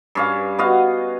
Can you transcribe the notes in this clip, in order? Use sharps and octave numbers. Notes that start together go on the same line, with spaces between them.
G2 C#4 F5
B3 F#4 D#5 F5